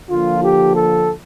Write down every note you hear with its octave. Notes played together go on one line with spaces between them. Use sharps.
D3 F3 A#3 F4
G4
A4